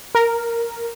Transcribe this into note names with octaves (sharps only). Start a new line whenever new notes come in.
A#4